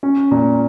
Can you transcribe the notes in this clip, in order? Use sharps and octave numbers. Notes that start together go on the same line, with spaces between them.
C#4
A#2